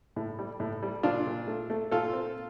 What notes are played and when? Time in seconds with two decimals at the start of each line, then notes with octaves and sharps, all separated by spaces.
0.16 A2
0.39 G3
0.60 A2
0.83 G3
1.03 A#2 D4 F4
1.26 A#2
1.47 A3
1.70 A3
1.91 A#2 F4 A4
2.13 C4